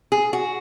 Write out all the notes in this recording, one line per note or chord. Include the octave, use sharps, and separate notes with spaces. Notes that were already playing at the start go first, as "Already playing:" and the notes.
G#4
F#4